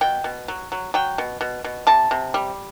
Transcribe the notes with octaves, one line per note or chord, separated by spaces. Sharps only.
B2 G5
B2
F#3
F#3
F#3 G5
B2
B2
B2
C3 A5
C3
G3